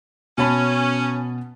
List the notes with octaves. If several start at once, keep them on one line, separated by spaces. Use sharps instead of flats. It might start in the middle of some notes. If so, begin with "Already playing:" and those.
B2 C#4 A5 B5